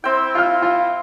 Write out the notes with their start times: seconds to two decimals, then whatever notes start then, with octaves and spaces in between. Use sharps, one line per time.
0.04 C4 E4 G5
0.35 F4 F6
0.62 F4